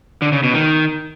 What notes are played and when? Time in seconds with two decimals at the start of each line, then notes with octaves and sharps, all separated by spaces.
0.22 D3
0.32 C#3
0.43 B2
0.54 D#3